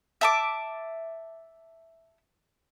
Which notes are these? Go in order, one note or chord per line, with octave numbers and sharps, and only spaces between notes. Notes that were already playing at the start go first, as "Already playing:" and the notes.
E5 A5 D6